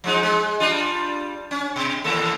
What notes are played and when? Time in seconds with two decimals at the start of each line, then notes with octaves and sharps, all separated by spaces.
0.04 F3 G#3 D#4
0.23 G#3
0.60 G3 D4 F4
1.51 C#4
1.76 B2
2.04 D#2 A#3 A4